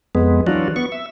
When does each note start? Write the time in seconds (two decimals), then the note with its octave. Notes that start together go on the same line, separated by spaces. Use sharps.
0.15 F2 G#3 B3
0.47 E3 F#3 D4 F4 F#4
0.76 B3 C#6
0.92 E5